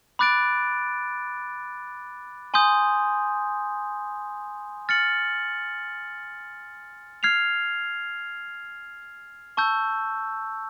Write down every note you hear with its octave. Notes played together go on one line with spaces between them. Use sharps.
B5 D6 F#6 A6 D7
G#5 C6 D#6 G6
F6 A6 C#7 F#7
F6 G#6 C7 F7
A5 C#6 E6 G6